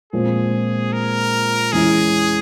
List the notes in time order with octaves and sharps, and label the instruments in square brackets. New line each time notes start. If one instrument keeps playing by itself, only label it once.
[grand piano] A#2 F3 G#3 C4 [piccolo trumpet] G#4
[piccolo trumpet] A#4
[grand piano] E2 E3 G#3 C#4 E4 [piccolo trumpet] G#4